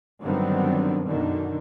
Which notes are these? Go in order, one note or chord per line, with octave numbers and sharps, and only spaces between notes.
G2 D3 D#3 F#3 B3 C4
F#2 B2 D3 D#3